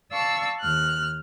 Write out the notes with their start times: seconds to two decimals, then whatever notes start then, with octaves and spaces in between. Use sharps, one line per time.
0.12 D5 F5 A5 C#6 E6
0.61 D#2 F6 F#6